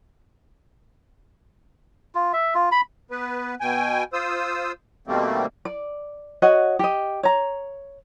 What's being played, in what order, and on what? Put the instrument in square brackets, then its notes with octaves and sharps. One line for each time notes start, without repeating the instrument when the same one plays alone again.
[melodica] F4
E5
F4
B5
[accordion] B3 B4
B2 G5 G#5
F4 C5 D#6 E6
B2 D#3 G3 A3 A#3 C4
[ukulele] D5
F#4 C#5 D#5 F#5
G4 D#5
C#5 A#5